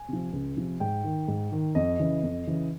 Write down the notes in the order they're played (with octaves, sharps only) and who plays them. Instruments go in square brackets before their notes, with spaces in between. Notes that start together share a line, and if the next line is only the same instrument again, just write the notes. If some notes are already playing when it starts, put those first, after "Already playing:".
Already playing: [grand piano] G#5
C3 F3
C#2
C3 F3
G#2 G5
D#3
G#2
D#3
F2 D#5
C#3 E3
F2
C#3 E3